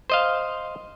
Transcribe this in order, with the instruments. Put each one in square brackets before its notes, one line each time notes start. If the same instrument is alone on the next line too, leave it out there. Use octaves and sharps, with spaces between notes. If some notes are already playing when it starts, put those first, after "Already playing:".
[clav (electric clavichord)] C5 D#5 F5